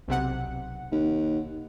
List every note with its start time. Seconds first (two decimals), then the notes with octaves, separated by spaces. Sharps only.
0.08 B1 C3 F#5
0.92 D#2